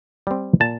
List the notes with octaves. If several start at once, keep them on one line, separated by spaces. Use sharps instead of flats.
G3 C4
A#2 A5